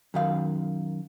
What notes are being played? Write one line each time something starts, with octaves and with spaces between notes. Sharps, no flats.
F#2 D#3 F5